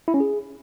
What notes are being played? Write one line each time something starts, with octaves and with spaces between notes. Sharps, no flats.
E4
C#4
G#4